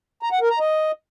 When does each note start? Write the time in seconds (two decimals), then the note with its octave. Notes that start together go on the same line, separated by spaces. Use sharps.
0.23 A#5
0.32 F#5
0.41 A#4
0.50 A#5
0.59 D#5